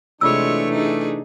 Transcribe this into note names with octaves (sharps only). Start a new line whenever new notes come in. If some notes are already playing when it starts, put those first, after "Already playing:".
C3 E3 G#3 A3 D4 F4 C#5 E6
D#4 G#4